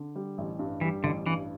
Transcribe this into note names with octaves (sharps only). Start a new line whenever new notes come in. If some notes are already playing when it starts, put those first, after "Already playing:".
Already playing: D3
G3
A1
G2
E3 G3
A1 D3
G2 E3